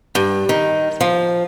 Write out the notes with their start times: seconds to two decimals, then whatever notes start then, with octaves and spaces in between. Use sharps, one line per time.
0.15 G2
0.49 D#3
1.01 F3